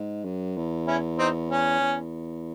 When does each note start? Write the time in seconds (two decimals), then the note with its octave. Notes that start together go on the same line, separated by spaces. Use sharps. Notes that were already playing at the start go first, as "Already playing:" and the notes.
Already playing: G#2
0.24 F#2
0.57 E2
0.87 C#4 E4
1.18 C4 D#4
1.50 C#4
1.81 E2